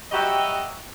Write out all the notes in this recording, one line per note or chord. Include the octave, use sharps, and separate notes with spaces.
F#3 G3 F#4 G4 D#5 E5